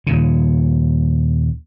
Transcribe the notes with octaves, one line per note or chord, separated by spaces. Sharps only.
D#2 A#2 C#3